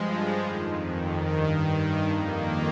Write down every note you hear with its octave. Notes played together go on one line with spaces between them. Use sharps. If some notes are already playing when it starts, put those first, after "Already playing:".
Already playing: G2 F3 G#3
F2 D#3
G2 D#3
F2 D#3 A#3